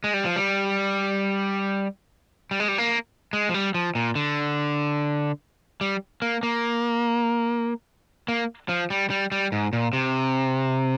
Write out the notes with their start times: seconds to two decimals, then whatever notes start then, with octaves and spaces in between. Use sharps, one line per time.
0.04 G#3
0.14 G3
0.25 F3
0.36 G3
2.51 G3
2.60 G#3
2.68 G3
2.78 A#3
3.33 G#3
3.49 F3
3.54 G3
3.74 F3
3.95 A#2
4.15 D3
5.81 G3
6.22 A#3
6.43 A#3
8.28 A#3
8.69 F3
8.90 G3
9.10 G3
9.32 G3
9.52 G#2
9.73 A#2
9.93 C3